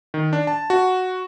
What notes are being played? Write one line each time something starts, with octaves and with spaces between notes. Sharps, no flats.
D#3
D4
A5
F#4